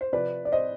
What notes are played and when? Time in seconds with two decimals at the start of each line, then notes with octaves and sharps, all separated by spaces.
0.01 C5
0.12 C3 F3 B4 D5
0.45 D5
0.52 C5 D#5